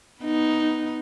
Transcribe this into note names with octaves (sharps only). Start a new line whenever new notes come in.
B3 D#4